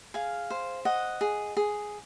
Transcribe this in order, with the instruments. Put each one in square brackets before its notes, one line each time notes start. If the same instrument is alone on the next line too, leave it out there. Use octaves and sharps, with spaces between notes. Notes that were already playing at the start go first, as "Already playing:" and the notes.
[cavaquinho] G#4 F5
C5
D#5 F#5
G#4
G#4